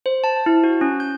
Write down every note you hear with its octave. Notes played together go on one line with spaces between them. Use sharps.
C5
A5
E4
F#4
C#4
G6